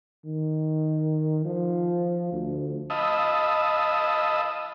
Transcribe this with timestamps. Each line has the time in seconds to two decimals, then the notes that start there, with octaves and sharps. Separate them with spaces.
0.25 D#3
1.45 F3
2.32 D2
2.90 D#5 F5 A5 B5 D#6 E6